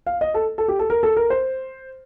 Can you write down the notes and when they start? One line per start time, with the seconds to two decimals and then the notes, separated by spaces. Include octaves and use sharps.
0.07 F5
0.21 D#5
0.34 A4
0.58 A4
0.68 G4
0.79 A4
0.90 A#4
1.03 A4
1.17 A#4
1.30 C5